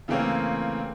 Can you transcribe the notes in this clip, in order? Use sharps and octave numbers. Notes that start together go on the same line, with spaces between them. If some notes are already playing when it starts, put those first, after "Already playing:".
C#3 E3 A3 A#3 C4 C#4